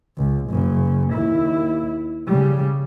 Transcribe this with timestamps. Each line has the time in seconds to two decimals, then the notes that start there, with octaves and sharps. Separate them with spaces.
0.17 C#2
0.50 F#1 C#3
1.13 D#2 E4
2.27 C#3 G3